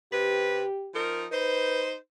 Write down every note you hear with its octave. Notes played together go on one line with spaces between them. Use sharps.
C3 G4 B4
F3 D#4 A#4
D#4 B4 C5